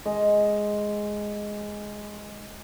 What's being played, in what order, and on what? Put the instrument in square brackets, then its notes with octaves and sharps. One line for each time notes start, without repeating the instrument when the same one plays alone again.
[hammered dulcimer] G#3 D#5